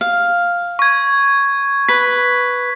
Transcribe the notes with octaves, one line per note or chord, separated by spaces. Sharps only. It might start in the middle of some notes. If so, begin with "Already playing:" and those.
F5
C#6 G#6
B4 B6